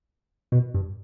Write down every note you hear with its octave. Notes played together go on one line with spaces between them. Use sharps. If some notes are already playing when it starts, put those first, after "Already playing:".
B2
G2